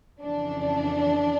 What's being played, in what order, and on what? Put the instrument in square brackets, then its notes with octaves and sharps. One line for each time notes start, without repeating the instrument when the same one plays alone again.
[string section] F2 C#3 E3 D4